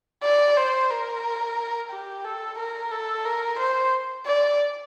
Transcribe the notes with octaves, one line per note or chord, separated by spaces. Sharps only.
D5
C5
A#4
G4
A4
A#4
A4
A#4
C5
D5